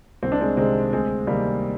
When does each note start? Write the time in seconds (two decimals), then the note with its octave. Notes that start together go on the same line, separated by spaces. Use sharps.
0.23 C2 C4
0.32 D4
0.41 G#3 C4
0.57 C3 D#3 G#3 C4
0.93 D2 G#3 C4
1.27 C3 D#3 G3 A#3